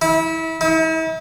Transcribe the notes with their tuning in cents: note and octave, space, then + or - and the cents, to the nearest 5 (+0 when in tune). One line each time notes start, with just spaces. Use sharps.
E4 -30
E4 -45